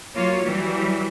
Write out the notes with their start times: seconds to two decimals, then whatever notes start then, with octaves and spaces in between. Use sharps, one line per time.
0.14 F#3 A#3 F4 C#5
0.45 E3 F#3 G3